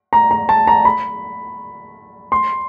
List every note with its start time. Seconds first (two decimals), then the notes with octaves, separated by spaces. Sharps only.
0.13 A#5
0.31 A#5
0.49 A5
0.67 A#5
0.85 B5
2.32 C6